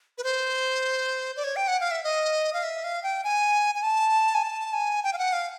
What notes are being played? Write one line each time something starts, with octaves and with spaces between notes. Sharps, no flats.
B4
C5
D5
C#5
G5
F#5
F5
E5
D#5
F5
E5
F5
G5
G#5
G#5
A5
G#5
A5
G#5
G5
F5
F#5
F5